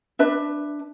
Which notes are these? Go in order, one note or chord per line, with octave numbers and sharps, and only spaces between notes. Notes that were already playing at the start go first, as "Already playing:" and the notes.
D4 B4 E5